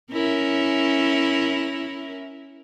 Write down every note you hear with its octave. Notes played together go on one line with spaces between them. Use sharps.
C#4 E4 A#4